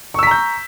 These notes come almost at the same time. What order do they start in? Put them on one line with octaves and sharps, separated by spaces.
C#6 E6 B6 A#5 G6